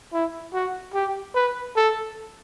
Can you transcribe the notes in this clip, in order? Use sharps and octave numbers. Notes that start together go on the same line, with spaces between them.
E4
F#4
G4
B4
A4